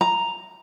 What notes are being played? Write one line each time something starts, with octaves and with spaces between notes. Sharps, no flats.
A#5